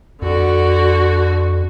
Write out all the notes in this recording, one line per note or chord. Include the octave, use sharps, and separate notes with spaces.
F2 D3 F#4